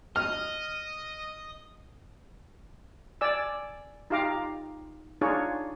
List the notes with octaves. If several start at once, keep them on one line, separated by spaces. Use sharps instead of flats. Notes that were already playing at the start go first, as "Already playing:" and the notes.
D#5 F6
D5 G#5 E6
D#4 F4 G4 F5 A#5 D6
D4 D#4 F4 G#4 C#5